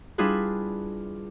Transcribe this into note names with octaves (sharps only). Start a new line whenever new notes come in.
G3 D4 E4 F4 G#4 B4